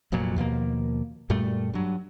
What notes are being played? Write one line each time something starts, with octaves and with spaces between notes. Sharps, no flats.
F1 F2 A#2 F#3
D#2 B2 F3 A#3
F#2 A#2 G3 A3
G2 F#3